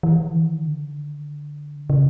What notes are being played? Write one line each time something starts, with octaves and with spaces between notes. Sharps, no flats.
E3
D#3
D3
C#3